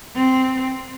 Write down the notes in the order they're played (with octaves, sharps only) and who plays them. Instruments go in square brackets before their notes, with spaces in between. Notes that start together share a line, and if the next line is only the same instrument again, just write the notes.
[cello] C4